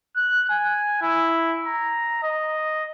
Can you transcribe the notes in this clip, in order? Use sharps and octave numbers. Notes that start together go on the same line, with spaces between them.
F#6
G#5
E4
A#5
D#5